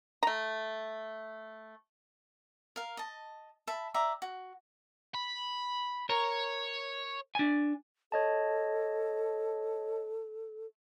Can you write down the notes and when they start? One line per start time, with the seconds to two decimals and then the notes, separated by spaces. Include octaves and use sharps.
0.23 A3 A#5
2.76 A#4 F5
2.97 D#5 A5
3.67 E5 A5 B5
3.94 G4 D5 E5 A#5
4.22 F#4
5.14 B5
6.10 A#4 C#5
7.35 D4 G#5
8.12 A4 C#5 D#5 A5